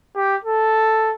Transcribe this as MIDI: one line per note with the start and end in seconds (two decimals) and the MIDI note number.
0.16 0.36 67
0.44 1.14 69